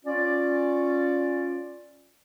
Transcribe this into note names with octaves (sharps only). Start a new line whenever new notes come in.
C#4 F4 D5